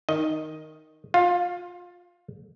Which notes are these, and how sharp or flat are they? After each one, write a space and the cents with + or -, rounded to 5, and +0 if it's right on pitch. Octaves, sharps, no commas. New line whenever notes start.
D#3 +0 D#5 +0
F4 +20 F5 +0